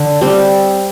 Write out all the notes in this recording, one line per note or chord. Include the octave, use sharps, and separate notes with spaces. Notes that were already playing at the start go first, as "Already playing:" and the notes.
Already playing: D3
G3 C4